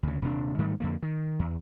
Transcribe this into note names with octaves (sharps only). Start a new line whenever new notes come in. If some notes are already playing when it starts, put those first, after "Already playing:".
D2 C#3
D#1 C3 A3 D4
G#2 D#3 G3 A3
F2 D3 A#3
D#3
E2